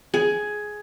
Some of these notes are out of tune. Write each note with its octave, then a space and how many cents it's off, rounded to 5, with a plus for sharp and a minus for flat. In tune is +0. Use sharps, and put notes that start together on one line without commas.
G#4 +10